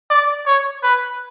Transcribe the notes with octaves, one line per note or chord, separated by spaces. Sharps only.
D5
C#5
B4